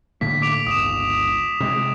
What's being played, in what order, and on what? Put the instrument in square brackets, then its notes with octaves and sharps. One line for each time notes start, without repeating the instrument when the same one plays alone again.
[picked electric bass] A2 D3 A#3 [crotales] B6
[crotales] D6 D7 F7
[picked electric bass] G1 C#2 [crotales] D#6 E7
[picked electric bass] C3 G#3